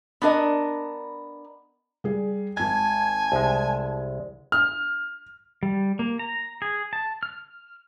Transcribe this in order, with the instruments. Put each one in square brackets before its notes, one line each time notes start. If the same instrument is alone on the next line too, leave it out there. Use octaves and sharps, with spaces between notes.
[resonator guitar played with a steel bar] B3 D4 A#4 D#5
[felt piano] G3 G#4
[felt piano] G#1 G#6 [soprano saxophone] G#5 [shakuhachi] A5
[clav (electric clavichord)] C2 G#3
[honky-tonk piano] F6
[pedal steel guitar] G3
A#3
A#5
G#4
A5
F6